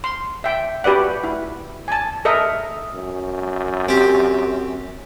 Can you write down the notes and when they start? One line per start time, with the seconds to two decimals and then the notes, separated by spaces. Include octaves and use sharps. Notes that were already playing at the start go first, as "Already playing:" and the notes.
0.04 C6
0.44 E5 G5
0.84 F#4 G4 B4 D5 F#5
1.24 E4
1.88 G#5 A5
2.25 A4 A#4 D#5 E5
2.94 F#2
3.88 C4 G4